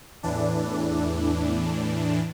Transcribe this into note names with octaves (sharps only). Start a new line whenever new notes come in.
E2 A2 E3 D4